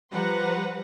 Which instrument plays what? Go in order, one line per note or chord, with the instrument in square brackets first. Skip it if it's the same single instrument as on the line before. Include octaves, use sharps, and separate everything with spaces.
[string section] F3 G3 B4 C5 F#5 A#5